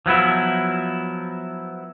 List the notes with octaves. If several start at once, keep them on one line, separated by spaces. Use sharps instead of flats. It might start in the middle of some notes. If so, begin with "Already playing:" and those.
F3 F#3 B3 E4